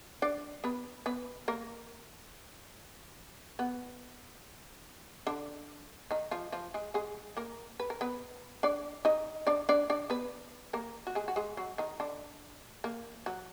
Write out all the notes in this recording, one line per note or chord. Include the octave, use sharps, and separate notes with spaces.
D4 D5
B3 B4
B3 B4
A#3 A#4
B3
D3 D4
D#3 D#4
F3 F4
F3 F4
G#3 G#4
G#3 G#4
A#3 A#4
B4
A#4
B3 B4
D4 D5
D#4 D#5
D4 D5
D4 D5
D4 D5
B3 B4
A#3 A#4
F#4
G#3 G#4
F#4
G#3 G#4
F#3 F#4
D#3 D#4
D3 D4
A#3
F#3